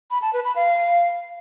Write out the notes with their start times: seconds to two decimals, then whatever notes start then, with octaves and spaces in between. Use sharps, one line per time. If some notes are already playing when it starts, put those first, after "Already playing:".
0.11 B5
0.22 A5
0.33 B4
0.44 B5
0.56 F5